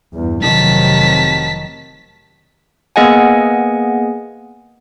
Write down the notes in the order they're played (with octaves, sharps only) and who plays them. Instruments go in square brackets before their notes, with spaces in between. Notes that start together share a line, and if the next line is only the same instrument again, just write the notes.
[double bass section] E2 G2
[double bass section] F1 C3 F#3 [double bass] D#3 [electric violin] A5 B6
[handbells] A#3 B3 G#4 D#5 F#5 G#5